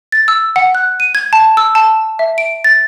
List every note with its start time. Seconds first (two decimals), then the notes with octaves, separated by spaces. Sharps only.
0.12 A6
0.28 E6
0.56 F#5
0.75 F#6
1.00 D#7
1.15 G#6
1.33 A5
1.57 E6
1.75 A5
2.19 E5
2.38 D7
2.64 A6